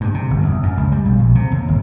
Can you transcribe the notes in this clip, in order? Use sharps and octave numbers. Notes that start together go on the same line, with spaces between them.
G2
C3
G1
E2
F#2
C#2
G3
B1
A#1
C3
D#2
G1